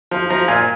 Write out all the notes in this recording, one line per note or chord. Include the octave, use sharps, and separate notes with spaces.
F3
F3 A#5
A#2 G#5